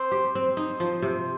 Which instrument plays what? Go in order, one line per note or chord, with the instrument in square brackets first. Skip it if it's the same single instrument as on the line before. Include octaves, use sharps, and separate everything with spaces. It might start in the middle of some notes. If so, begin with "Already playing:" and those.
Already playing: [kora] C4 [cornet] C5
[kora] G4
[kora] C4 [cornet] C5
[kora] D#4
F3
C3